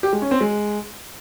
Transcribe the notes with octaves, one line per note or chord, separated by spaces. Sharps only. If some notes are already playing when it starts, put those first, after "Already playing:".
G4
G#3
C#4
C4
G#3